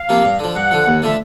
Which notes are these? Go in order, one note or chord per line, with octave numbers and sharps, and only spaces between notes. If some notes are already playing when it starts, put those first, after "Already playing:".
Already playing: F5
C3 F3 A#3
G2
D3 F3
G2 F#5
D3 F3
D#2
D3 F3 A3 E5